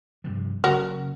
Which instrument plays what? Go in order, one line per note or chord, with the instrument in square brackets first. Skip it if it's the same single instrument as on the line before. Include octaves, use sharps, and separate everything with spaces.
[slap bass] G2 C3 F3
[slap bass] F#1 C#3 [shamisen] F#4 A#4